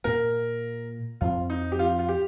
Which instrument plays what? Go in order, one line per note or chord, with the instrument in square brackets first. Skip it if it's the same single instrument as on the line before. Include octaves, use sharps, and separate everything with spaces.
[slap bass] A#2 A#3 [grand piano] A#4
[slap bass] F2 F3 C4 [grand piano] F4
[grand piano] D#4
G4
F4
F4
G4